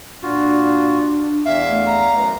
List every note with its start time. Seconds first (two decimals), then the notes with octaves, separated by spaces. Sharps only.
0.23 A#2 D4 F4 F#4
1.45 E2 E5 F5
1.69 A3
1.86 A#5
2.16 F#2 B4